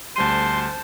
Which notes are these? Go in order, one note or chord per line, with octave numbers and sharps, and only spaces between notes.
D2 G3 C5 A5 C6 D#7